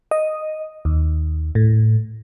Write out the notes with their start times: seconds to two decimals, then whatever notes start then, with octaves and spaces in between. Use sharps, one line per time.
0.11 D#5
0.85 D#2
1.55 A2